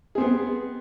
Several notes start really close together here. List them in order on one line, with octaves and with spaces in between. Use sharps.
G#4 C4 B3